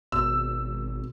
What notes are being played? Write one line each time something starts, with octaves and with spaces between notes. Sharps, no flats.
G#1 B2 E6